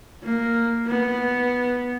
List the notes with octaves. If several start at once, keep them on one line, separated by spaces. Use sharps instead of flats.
A#3
B3